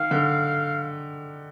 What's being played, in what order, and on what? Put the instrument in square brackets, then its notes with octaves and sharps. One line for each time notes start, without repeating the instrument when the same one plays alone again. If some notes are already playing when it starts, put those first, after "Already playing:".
Already playing: [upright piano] D#3 [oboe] F5
[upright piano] D3